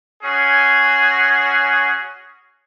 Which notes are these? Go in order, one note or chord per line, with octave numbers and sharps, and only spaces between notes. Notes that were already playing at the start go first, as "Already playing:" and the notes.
C#4 F#4 G#4